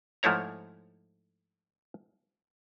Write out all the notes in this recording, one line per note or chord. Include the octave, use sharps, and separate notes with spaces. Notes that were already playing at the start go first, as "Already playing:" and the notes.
G#2 F3 A3 E4 C#5 A#5